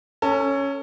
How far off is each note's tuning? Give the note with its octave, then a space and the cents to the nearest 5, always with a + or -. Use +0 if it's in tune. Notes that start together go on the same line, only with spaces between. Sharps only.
C#4 +0 A4 +30